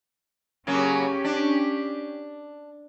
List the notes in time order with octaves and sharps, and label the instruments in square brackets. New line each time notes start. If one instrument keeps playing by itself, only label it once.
[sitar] C#3 F#3 A#3 [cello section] C#4 G4
[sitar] D4